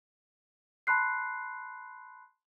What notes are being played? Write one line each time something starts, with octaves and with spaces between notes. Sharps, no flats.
A5 B5 C6 F#6 C7